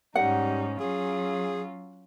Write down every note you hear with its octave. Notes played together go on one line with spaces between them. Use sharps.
G#2 G3 C#4 D#4 F#5
F#3 C#4 F4 G#4